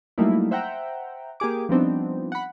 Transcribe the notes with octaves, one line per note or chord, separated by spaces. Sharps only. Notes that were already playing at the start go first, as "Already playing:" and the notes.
F#3 G3 A3 A#3 D#4 E4
C5 E5 F#5 G5 A#5
A#3 G4 G#4 D6
F3 G3 B3 C4 D4 D#4
F#5 B5